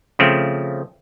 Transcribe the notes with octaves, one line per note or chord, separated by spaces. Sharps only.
C#3 F3 A3 C4